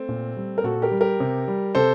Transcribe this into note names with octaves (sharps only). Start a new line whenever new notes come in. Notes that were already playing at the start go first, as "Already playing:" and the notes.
Already playing: A3 C4
A#2
G3
A#4
A#2 F#4 A4
G4 A#4
G3
G4 A#4
C3
G3
C3 A4 C5